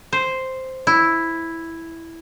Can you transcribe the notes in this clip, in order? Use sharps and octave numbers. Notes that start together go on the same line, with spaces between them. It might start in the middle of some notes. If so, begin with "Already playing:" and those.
C5
E4